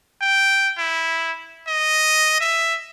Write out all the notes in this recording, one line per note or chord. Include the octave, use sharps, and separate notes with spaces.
G5
E4
D#5
E5